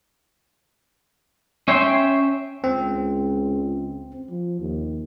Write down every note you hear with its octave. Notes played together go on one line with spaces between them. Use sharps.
C#4 C#5 E5 G5 C6
C#2 C4
F3
D#2